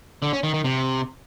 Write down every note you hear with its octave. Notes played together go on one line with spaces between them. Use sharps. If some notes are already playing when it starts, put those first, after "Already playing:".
D3
C#4
D#3
D#3
C3